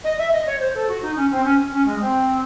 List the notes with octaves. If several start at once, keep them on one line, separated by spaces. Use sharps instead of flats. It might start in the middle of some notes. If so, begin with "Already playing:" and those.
D#5
E5
D#5
C#5
C5
A4
F#4
D#4
C#4
C4
C#4
C#4
G#3
C4